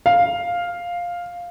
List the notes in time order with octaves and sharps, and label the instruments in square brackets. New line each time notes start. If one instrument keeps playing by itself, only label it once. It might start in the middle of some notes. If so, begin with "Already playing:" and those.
[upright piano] F5